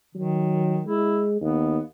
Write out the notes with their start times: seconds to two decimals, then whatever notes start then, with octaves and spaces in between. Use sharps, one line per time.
0.15 D#3 F#3
0.87 G#3 E4
1.41 D#2 B3